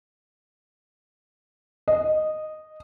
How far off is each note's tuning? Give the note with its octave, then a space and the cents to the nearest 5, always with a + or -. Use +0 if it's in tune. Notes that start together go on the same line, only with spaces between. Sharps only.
D#5 -10